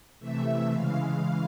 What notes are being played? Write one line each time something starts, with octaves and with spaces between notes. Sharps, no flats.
C3 E3 A3 E5
C#3 E3 G#3 F5